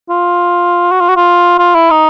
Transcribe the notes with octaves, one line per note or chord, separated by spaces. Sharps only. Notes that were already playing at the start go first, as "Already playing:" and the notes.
F4
F#4
F4
F#4
F4
F4
E4
D#4